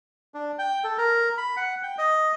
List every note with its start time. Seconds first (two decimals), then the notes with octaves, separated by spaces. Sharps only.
0.34 D4
0.59 G5
0.84 A4
0.98 A#4
1.38 B5
1.57 F#5
1.83 G5
1.98 D#5